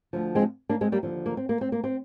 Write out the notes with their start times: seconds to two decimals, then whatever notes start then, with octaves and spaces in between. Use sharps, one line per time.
0.13 D2 D3 F3
0.35 G#3 C4
0.69 A#3 D4
0.81 G#3 C4
0.92 G3 A#3
1.03 D#2 D3 F3
1.26 A#3
1.37 C4
1.49 A#3
1.61 C4
1.72 A#3
1.84 C4